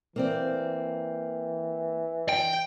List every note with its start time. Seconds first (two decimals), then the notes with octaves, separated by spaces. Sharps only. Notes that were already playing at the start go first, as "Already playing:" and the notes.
0.16 E3 A#3 C4 D5
2.29 G5